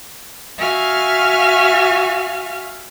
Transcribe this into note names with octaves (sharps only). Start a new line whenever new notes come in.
F#4 E5 F5 G#5 F6